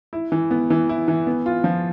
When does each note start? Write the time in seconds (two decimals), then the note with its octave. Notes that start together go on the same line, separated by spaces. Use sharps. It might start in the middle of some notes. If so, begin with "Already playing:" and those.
0.13 E4
0.32 E3
0.51 B3
0.70 E3
0.89 E4
1.08 E3
1.27 B3
1.46 F4
1.64 F3